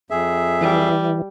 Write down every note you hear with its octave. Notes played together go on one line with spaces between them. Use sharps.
F2 G#4 E5
E3 G3